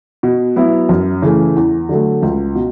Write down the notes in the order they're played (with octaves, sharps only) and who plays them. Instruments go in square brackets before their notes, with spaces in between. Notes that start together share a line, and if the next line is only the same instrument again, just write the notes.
[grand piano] B2
F#3 B3 E4
F#2
C#3 E3 A3
E2
D3 F#3 A3
C#2
B2